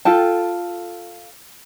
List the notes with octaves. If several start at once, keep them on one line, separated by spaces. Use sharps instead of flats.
F4 A4 G5 A5